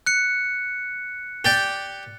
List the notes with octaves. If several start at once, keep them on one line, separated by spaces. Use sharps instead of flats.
F#6 C#7
G4 D5 G5